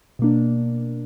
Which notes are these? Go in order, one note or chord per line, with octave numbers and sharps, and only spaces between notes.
B2 A#3 D4